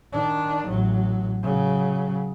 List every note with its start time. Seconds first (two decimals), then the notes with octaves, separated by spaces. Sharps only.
0.13 D#3 D4
0.68 A1 F#3
1.43 C#3 F#3